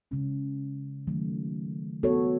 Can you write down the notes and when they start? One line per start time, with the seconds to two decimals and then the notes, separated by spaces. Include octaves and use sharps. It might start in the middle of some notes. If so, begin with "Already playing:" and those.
0.11 C#3 G#3 C#4
1.07 D#3 F#3 A3
2.03 B3 F#4 A4 C#5